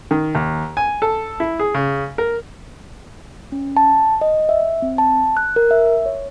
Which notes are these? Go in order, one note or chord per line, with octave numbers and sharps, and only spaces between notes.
D#3
D#2
G#5
A4
E4
G#4
C#3
A#4
C#4
A5
D#5
E5
C4
A5
F#6
A#4
E5
C#5